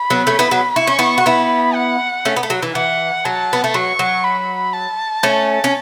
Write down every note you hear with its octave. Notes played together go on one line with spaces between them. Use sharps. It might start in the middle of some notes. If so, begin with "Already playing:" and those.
Already playing: B5
F#3 B3
A3 C#4
B3 E4
F#3 B3
E4 C#6
C#4
B3 E4
F#4
B3 E4 B5
F#5
A3 C#4
B3
A3
F#3
E3
E3 F#5
F#3 A5
B3
A3
F#3 C#6
F#3
B5
A5
A3 C#4
C#4